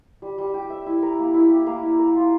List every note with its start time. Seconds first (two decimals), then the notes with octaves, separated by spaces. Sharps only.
0.22 G3
0.38 G3
0.54 G4
0.70 E5
0.86 E4
1.02 A#4
1.19 A#3
1.34 E4
1.50 G4
1.67 A#3
1.83 E4
1.99 A#4
2.16 F4